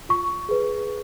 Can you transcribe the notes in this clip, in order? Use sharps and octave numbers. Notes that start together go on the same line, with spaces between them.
F4 C#6
G#4 B4